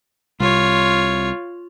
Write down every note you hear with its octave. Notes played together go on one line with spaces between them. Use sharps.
C2 F4 C#5